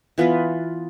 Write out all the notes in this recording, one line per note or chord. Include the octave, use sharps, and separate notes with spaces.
E3 B3 F4 B4